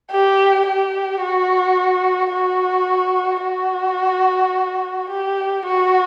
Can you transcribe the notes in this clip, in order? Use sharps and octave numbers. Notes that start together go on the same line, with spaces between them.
G4
G4
F#4
F#4
F#4
G4
F#4